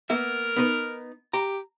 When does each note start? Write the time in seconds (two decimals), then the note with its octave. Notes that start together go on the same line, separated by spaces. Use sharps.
0.10 A#3 B3 A#4 E5
0.56 B3 D#4 B4
1.33 G4 A#5